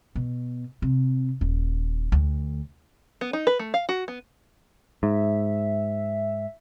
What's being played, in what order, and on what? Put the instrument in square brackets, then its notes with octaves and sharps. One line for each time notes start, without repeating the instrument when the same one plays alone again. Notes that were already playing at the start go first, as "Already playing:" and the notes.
[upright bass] B2
C3
D#1
D2
[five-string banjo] B3
D#4
B4
A3
F5
F#4
B3
[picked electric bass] G#2 [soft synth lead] E5